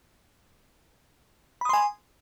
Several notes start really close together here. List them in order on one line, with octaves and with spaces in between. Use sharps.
B5 D#6 C6 G#5